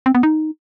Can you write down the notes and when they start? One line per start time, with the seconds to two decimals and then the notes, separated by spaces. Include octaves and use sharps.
0.06 C4
0.15 B3
0.23 D#4